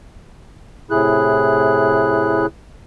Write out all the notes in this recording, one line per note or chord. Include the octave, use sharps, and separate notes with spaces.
A2 C3 E4 G#4 F#6